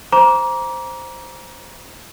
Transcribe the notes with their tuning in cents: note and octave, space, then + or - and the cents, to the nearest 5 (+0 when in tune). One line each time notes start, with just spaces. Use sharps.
C5 +0 A#5 +25 D6 -20